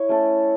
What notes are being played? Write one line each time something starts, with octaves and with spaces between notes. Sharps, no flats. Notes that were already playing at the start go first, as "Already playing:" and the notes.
Already playing: E4 C#5 E5
A3 C#4 A4